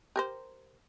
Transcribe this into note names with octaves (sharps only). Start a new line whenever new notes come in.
G4 A#4 C5